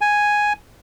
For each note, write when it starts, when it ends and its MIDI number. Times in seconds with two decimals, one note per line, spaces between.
0.01 0.53 80